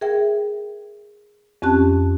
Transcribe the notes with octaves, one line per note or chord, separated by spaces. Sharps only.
G#4 A#4 E5 G5
F2 C4 C#4 G4 A5 F#6